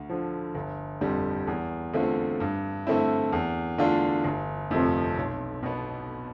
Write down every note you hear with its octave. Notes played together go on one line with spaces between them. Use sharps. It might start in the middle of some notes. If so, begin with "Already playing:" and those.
Already playing: D2
D3 F3
G1
F2 D3 G3
E2
D3 A3 C4 F4
G2
D3 A3 C4 E4
E2
D3 A3 D4 F4
G1
F2 C3 F3 A3
B1
B2 B3